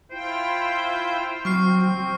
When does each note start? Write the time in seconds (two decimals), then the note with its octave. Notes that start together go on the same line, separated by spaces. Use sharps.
0.11 E4 F4 C5 G5
1.45 F#3 C4 C#6 F6 C7